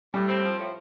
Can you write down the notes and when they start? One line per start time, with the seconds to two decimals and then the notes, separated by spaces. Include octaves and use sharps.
0.14 A2 G3
0.29 C4
0.43 F3
0.59 A2